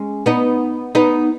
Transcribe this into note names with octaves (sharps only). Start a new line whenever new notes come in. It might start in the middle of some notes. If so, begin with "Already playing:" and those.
Already playing: G#3 C#4
B3 D#4
B3 D#4